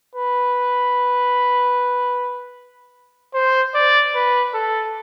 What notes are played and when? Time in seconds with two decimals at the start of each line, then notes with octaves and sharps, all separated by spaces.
0.15 B4
3.34 C5
3.74 D5
4.15 B4
4.54 A4